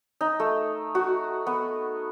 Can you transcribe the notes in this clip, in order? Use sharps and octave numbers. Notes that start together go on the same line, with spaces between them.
D#4
A3
F#4
B3